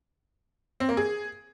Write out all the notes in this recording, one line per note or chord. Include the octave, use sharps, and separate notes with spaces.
C4
A#3
G#4